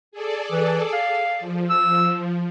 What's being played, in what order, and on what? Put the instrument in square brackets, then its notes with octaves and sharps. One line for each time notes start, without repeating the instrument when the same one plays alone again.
[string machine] G#4 A4 D5
[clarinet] E3
F5
[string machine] F3
[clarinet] E6